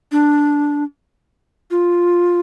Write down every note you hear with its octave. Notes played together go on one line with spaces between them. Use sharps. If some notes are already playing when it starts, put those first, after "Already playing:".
D4
F4